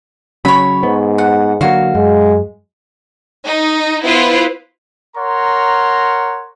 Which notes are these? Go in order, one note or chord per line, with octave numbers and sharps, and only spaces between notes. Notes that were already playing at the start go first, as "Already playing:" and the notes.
C#3 F#3 C#4 C#5 B5
G#2 B3
F#5
D3 F#3 A#3 F#4 F5
F#2 G#3
D#4
B3 E4 F4 B4 C5
A#4 C#5 F#5 A#5 C6